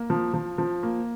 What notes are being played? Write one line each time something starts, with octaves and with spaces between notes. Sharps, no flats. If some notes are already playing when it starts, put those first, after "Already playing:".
Already playing: A#3
F3
F3
F3
A#3